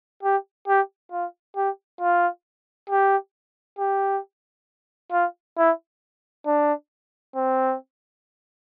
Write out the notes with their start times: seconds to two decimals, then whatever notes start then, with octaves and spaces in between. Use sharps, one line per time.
0.23 G4
0.68 G4
1.12 F4
1.56 G4
2.01 F4
2.90 G4
3.79 G4
5.12 F4
5.57 E4
6.47 D4
7.36 C4